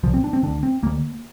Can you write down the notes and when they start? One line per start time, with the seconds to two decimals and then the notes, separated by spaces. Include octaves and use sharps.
0.03 C2 F3
0.06 A#2
0.14 C4
0.24 D4
0.33 C4
0.43 D2 D3 D4
0.63 C4
0.83 D2 D3 A#3